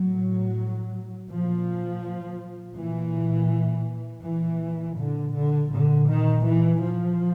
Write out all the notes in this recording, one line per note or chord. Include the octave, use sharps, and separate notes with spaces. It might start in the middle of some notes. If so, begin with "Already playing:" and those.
Already playing: A2 F#3
A#2 F3
A#2 E3
A#2 E3
D3
D3
A#2 D3
D#3
E3
F3